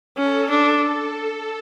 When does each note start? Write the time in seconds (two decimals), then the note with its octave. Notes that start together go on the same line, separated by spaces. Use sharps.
0.17 C#4 A4
0.50 D4